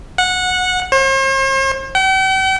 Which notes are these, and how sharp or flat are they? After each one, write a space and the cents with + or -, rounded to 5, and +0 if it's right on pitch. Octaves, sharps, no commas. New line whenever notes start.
F#5 -15
C5 +45
G5 -45